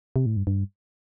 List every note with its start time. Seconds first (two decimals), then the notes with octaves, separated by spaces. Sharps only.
0.16 C3
0.26 A2
0.37 G2
0.47 G2